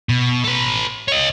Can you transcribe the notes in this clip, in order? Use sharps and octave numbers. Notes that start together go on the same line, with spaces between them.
B2
A4 B4
C#5 D#5